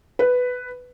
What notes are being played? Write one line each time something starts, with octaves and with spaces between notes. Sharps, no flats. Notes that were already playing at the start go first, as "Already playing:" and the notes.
B4